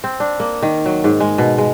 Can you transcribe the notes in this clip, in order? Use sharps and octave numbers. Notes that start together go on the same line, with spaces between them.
C4
D4
A#3
D#3
F#3
G#2
G#3
B2
G#3